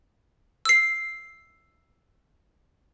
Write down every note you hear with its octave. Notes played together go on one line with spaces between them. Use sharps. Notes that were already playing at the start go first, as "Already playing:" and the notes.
E6 C7